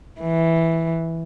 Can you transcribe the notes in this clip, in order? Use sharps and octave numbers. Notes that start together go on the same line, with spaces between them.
E3